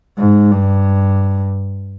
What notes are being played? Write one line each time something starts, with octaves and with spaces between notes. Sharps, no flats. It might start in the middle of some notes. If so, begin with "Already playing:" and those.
G#2
G2